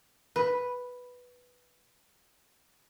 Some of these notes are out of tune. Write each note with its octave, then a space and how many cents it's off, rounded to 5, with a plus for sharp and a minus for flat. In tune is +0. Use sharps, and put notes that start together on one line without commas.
B4 +0